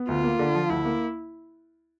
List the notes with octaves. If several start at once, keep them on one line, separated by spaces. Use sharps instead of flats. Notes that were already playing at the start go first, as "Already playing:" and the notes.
Already playing: B3
D2 F4
A#3
D3
F3
D2 E4
A#3